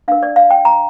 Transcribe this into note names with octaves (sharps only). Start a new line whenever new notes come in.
D4 A#4 F5
D5
F5
G5
A#5